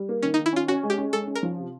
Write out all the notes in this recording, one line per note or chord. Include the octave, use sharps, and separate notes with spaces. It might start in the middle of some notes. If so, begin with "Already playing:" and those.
Already playing: G3
A#3
D#3 C#4
D#4
D#3
E4
C#4 F4
C#4 F#4
G#3
G4
C#4
G#3 A4
C#4
A#4
F3
C3